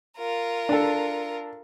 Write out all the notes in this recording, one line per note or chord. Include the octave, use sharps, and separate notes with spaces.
F4 A#4
D4 A4